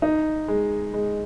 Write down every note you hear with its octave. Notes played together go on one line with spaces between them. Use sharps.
D#4
G#3
G#3